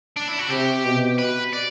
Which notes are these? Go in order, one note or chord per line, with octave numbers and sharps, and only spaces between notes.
D4
E4
F#4
C3 G4
B2
B4
D5